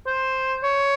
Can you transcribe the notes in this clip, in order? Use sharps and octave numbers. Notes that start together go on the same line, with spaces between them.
C5
C#5